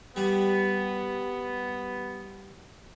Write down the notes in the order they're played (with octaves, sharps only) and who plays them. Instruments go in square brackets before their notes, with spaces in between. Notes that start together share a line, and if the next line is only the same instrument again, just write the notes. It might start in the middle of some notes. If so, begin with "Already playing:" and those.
[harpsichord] G3 [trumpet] B3